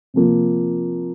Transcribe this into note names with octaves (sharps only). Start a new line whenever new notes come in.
C3 F3 A#3